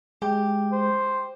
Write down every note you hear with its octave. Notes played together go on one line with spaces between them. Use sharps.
G#3 G4
C5